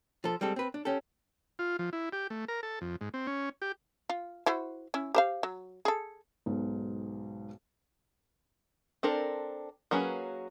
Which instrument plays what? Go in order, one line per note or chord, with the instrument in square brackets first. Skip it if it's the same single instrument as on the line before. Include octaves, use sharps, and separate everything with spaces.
[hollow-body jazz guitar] F3 A4
G3 G#3 C4 A4
C4 B4
D4
C#4 G4 A4
[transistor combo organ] F4
F3
E4
G4
A3
A#4
A4
F2
G#2
C4
C#4
G4
[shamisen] F4
E4 F#4 C5
C#4 E4
G4 C5 F5
F#3
G#4 A4
[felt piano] B1 G#2 B2
[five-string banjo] C4 D4 A4 A#4
F#3 A#3 C#4 G#4 B4